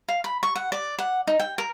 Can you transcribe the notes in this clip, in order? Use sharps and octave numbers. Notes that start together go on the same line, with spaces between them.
F5
B5
C#6
F#5
D5
F#5
D#4
G5
A#4